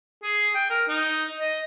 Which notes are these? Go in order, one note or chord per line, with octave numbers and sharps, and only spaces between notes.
G#4
G5
A#4
D#4
D#5